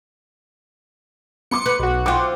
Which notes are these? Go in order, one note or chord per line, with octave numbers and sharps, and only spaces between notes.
B3 C6 D6 C#7
B4
B1 F#4
C4 F4 F#5 G5 D6